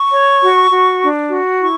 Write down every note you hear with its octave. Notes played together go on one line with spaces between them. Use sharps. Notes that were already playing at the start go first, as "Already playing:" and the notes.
Already playing: C#6
C#5
F#4
F#4
D4
F#4
E4 C#6